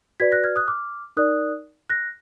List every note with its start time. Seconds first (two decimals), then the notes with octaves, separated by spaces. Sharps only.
0.20 F#4 B4 D5 G#6 B6
0.32 F#6 A#6
0.44 F6 G#6
0.56 D#6 F#6
0.68 D6 F6
1.17 D#4 A#4 D5 D#6 F#6
1.89 F#6 A#6